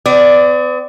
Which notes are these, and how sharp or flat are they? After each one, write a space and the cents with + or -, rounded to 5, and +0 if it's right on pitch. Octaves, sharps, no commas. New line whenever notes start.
B3 +45 D5 +0